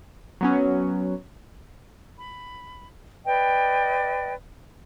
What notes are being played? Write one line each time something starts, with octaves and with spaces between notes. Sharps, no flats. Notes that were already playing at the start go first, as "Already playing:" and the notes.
F#3 B3 C#4
B5
B4 D5 D#5 G5